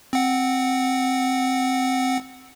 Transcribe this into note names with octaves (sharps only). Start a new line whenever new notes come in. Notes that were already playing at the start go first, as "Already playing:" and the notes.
C4 F#5